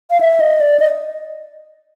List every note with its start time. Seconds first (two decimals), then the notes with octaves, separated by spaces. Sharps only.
0.11 F5
0.21 E5
0.40 D#5
0.60 D5
0.80 D#5